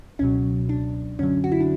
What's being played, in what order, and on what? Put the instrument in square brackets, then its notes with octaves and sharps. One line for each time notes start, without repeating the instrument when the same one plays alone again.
[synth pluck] C#2 B2 F#3 C#4
D4
F#2 D3 F#3 C#4
F#4
E4
D4